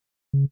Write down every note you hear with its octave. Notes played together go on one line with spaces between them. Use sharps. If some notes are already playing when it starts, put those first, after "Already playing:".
C#3